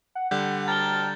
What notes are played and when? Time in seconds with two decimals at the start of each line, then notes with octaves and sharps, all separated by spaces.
0.15 F#5
0.31 D3 G3 F#5 G6
0.68 G5 A5 A#5 F6 A6 G7